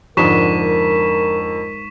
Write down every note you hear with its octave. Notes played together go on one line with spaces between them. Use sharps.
F2 G#2 D3 D4 A#4 C#6 B6 E7